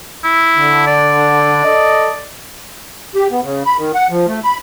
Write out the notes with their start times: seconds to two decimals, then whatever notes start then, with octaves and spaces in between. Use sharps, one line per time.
0.24 E4
0.56 D3
0.87 D5
1.65 A4 D#5
3.15 G4
3.31 B3
3.43 C#3
3.65 B5
3.78 D#3
3.95 F#5
4.10 F3
4.27 A3
4.44 B5